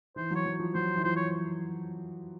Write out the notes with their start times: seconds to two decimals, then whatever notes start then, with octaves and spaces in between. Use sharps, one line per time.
0.16 E3 C5
0.31 F#3 C#5
0.46 F#3
0.60 F3
0.75 F#3 C5
0.96 E3
1.04 F3 C5
1.16 C#5